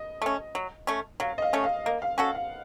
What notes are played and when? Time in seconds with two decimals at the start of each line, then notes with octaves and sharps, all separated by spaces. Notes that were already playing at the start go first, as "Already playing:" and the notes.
Already playing: D#5
0.22 A3 C#4
0.55 F#3
0.87 A3 C#4
1.20 F#3 F5
1.38 D#5
1.42 F5
1.53 A3 C#4
1.64 F5
1.85 A#3 D#5
2.02 F5
2.18 C#4 F#4 A4 F#5
2.35 F5